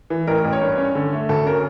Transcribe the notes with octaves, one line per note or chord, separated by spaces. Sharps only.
E3
A1 A#4
A1
C#5
G2
C#4
D3
A3
D2 A4
C#4 A#4